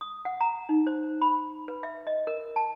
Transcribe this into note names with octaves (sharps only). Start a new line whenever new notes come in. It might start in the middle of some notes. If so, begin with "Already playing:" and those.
D#6
F#5
A#5
D#4
C5
B5
B4
E5
D#5
A#4
A5